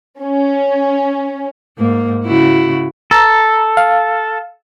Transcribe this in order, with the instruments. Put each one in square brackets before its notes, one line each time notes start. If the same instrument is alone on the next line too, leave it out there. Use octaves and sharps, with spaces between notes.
[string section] C#4
[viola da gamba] G#2 A#3
C#3 E4 F#4
[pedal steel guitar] A4 [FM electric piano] A#5 E6
[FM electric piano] F5